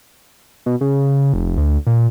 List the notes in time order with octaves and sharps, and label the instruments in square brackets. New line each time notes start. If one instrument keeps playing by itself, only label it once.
[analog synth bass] B2
C#3
F1
D2
A#2